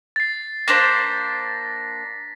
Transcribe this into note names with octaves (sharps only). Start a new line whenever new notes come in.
A6 C7
A#3 D4 C5 A#6 B6